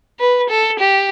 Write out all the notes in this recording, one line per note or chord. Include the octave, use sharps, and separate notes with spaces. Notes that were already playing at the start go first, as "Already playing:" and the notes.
B4
A4
G4